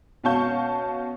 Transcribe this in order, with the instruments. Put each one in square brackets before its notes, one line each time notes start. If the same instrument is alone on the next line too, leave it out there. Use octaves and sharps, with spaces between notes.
[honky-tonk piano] B2 C#4 F5 A5 C#6 G6